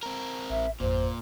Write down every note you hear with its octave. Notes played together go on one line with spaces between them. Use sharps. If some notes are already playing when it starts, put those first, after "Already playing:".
C4 A#4
A1 E5
G#1 F2 A#2 C5